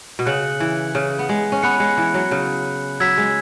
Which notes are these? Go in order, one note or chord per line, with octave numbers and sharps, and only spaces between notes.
B2
C#3 F#6 C#7 F#7
E3
C#3
B3
G#3
C#4
B3 B5 F#6 C#7
G#3
E3
F#3
C#3
F#3 E6 G#6 B6 E7
G#3